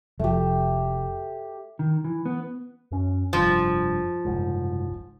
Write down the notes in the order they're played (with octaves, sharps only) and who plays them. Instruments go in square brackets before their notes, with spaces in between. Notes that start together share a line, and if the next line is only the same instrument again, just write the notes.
[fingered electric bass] F1 F3 [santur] A3 G4
[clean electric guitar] D#3
E3
B3
[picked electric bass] F#2 C#4
[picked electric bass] F1 G2 [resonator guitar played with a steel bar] F3
[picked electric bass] F#1 C2 G#2